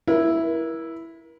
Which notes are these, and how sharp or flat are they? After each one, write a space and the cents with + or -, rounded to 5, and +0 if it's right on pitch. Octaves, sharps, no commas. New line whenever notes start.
E4 +0 A#4 +40